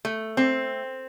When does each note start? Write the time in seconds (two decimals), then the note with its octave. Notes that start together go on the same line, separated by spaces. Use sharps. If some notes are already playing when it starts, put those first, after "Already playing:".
0.05 A3
0.37 C4